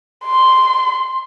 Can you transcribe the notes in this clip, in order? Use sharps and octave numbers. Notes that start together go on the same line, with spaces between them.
C6